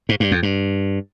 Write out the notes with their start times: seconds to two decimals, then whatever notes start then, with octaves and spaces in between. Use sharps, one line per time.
0.09 G#2
0.20 G2
0.31 F2
0.43 G2